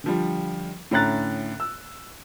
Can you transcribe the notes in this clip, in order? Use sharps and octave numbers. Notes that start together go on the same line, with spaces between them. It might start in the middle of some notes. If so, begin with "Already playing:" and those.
D3 F3 G3
A2 D3 C#4 A#5 F#6 A6
E6